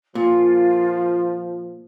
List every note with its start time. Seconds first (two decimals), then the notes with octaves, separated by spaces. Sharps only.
0.15 A#2 F3 F4